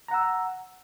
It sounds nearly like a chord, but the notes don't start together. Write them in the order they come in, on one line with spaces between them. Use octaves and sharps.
A#5 F#5 E6